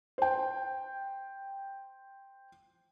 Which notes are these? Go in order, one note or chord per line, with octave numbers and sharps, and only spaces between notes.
C5 G5